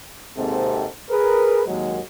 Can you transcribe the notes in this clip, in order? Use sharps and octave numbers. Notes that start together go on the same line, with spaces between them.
G#1 D#2 G#2 C3 C4 A4
G#4 A#4 B4
D#2 F#3 G#3